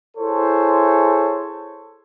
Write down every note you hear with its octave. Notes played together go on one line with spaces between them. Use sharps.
E4 G#4 A4 C5 C#5